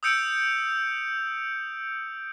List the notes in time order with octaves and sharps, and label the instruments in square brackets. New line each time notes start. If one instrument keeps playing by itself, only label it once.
[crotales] D#6 E6 G6 C#7 D7